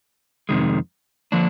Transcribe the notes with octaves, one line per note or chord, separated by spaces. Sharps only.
F2 C3 D#3 G#3
D3 F3 A#3 D4